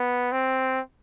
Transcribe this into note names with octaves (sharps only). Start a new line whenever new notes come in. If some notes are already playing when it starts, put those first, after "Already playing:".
Already playing: B3
C4